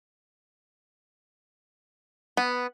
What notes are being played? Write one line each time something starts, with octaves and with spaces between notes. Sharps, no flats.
B3